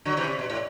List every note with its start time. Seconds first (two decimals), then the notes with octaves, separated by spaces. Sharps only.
0.05 D3 F#3
0.17 C3 E3
0.28 C3
0.39 B2
0.50 A2